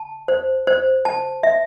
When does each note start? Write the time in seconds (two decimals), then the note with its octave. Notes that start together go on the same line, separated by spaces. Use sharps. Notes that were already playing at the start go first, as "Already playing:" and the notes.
Already playing: A5
0.28 C5
0.67 C5
1.05 A5
1.43 E5